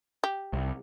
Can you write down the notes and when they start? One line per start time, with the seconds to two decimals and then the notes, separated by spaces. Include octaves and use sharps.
0.24 G4
0.53 C2